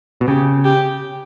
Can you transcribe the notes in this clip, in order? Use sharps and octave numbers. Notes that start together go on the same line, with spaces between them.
B2
C#3 G4
G4